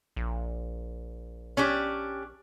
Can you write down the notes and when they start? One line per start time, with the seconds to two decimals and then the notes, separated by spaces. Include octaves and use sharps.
0.16 A#1
1.57 C#4 D4 G4